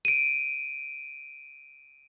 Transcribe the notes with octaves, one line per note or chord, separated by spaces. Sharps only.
D7 D#7